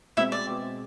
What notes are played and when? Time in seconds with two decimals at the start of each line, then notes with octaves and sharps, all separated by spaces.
0.17 B2 G#3 C4 E4 E5
0.32 D5
0.47 B2 G#3 C4